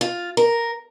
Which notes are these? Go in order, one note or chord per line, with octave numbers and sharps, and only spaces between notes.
F4
A#4